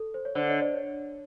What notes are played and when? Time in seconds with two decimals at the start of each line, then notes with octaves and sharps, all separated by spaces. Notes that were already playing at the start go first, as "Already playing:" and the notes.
Already playing: A4
0.14 C5
0.25 C#5
0.35 D3 C5 D5
0.48 C#5 D#5
0.61 C5 D5
0.74 C#5